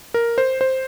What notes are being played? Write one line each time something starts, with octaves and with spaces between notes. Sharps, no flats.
A#4
C5
C5